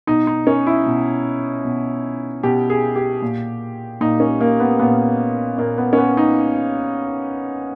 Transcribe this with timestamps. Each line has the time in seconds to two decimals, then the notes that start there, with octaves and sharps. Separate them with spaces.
0.07 B2 D#4
0.27 D#4
0.47 C#4
0.67 E4
0.86 B2
1.65 B2
2.43 B2 G4
2.70 G#4
2.96 G4
3.22 A#2
4.01 A#2 D#4
4.20 C#4
4.41 A#3
4.60 B3
4.79 A#2 B3
5.58 A#2 A#3
5.78 B3
5.93 C#4
5.98 B3
6.17 D#4